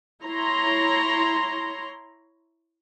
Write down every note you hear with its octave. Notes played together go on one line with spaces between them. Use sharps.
E4 C#5 A#5 C6